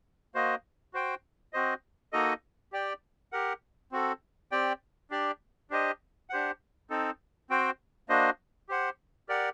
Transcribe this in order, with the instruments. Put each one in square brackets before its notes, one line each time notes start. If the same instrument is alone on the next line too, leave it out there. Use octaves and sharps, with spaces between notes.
[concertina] A#3 F#4 C5 D#5
F#4 C5 G5
C4 F#4 C5 D#5
A#3 D#4 F#4 A4 D#5
G4 D5 G5
G4 A#4 F#5
C4 F#4 A4
C4 G4 D5 G5
D4 G4 D5
D4 G4 C5 D#5
D4 G4 C5 F#5
C4 D#4 A4
C4 F#4 C5 G5
A#3 D4 F#4 C5 D#5
G4 C5 F#5
G4 A#4 D5 F#5